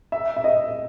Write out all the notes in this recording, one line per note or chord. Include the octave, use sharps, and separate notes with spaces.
E5
E5
D#5